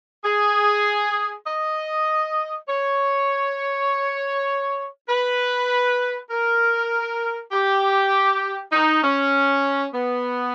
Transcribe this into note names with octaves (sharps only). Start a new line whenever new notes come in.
G#4
D#5
C#5
B4
A#4
G4
D#4
C#4
B3